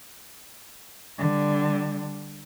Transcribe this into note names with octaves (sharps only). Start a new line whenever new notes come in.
D3 G3